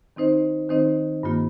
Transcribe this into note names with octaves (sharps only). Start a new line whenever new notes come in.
D#3 C4 D#4 C5 D#5
D#3 C4 D#4 C5 D#5
G2 D#3 A#3 F4